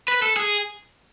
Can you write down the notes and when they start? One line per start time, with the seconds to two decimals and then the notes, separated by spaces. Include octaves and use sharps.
0.08 B4
0.22 A4
0.36 G#4